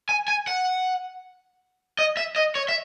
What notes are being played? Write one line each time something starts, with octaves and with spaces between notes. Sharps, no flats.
G#5
G#5
F#5
D#5
E5
D#5
C#5
E5